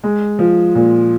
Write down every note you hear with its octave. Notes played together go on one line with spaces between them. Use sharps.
G#3
F3
A#2